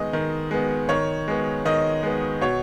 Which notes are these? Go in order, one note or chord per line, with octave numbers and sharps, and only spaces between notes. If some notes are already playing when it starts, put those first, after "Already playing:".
Already playing: D#3 G#3 B3 D#5
D#3
G#3 B3
D#3 C#5
G#3 B3
D#3 D#5
G#3 B3
B2 C#5